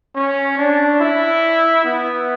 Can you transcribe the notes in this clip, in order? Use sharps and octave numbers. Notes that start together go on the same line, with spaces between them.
C#4
D4
E4
B3